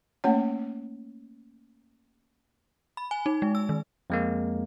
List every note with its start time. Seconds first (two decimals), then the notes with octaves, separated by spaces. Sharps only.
0.24 A3 A#3 C#4 C#5 F#5
2.97 B5
3.11 G#5
3.26 D#4
3.42 G#3
3.55 E6
3.69 D#3
4.10 F2 G#3 A#3